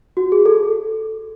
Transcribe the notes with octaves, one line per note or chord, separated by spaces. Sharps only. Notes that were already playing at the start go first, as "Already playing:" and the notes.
F#4
G#4
A4